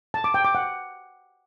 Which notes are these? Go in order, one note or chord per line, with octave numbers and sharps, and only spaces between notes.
A5
D6
G5
D6
F#5